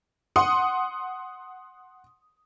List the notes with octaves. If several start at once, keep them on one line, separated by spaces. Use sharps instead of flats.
F#5 C6 D#6